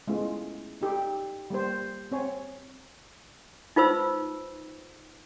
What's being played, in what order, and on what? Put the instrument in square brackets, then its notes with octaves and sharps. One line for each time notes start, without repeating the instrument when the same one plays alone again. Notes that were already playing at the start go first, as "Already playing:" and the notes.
[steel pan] G#3 A3 B3 C#4 E4 F4
D#4 G4 A4
G3 A#3 C5
C4 C#5 G#5
[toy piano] D#4 F4 B4 C5 E6